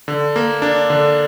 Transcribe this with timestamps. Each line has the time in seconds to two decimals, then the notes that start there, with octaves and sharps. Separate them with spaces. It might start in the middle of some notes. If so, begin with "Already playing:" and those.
0.08 D3
0.36 A#3
0.62 D4
0.90 D3